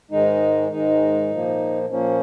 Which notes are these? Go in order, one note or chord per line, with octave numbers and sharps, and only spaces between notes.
G#2 D#3 G#3 D#4
G#2 D#3 G#3 D#4
A#2 F3 A#3
A#2 F3 A#3 C#4